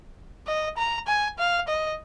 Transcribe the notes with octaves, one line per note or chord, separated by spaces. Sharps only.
D#5
A#5
G#5
F5
D#5